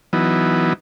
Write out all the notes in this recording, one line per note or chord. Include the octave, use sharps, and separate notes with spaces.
E3 F#3 B3 D#4